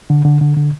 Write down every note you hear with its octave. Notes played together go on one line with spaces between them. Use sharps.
D3
D3
D3
D3